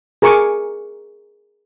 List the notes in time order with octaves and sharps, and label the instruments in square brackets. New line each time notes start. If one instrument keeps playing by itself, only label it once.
[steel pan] G#4 A#4 G#5 C#6 D6